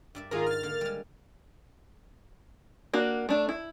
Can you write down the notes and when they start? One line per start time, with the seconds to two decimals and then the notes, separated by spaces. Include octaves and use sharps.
0.15 G2 D5 E5
0.31 G#2 D#3 F4 G#4 A#4
0.46 F6 A6
0.63 D3 A#3
0.81 G3 G#3
2.93 A#3 D4 F#4
3.29 A3 D4
3.49 E4